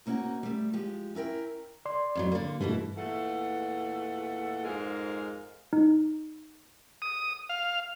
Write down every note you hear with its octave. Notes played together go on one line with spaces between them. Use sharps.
C3 A#3 C#4 D#4 F#4
G3 A3
F3 G#3 G4
C#4 E4 A#4 G5
D5 C6
F2 A2 F#3
D3 A#3
G2 B2 E3 A3 E4
E2 A#2 A3 A4 F#5
F2 G#2 G#3 A#4 F5
D#4
D#6
F5